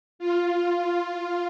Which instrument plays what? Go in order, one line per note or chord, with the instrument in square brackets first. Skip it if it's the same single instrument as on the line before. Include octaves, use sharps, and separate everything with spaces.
[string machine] F4